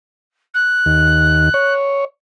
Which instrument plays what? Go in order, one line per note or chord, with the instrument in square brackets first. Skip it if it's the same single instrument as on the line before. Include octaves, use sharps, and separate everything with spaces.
[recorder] F#6
[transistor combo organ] D#2
C#5